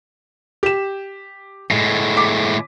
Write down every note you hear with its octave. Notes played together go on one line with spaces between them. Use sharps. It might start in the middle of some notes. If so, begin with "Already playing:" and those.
G4 E7
A2 G#3
D6 B6